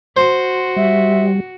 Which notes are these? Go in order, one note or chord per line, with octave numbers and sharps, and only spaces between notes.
F#4 C5
G3 E5